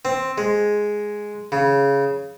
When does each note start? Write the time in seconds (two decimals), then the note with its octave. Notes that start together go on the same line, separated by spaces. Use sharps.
0.05 C4
0.38 G#3
1.52 C#3